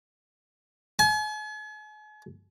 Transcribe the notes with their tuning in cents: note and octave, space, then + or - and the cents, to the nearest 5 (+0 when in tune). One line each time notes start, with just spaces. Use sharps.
G#5 +40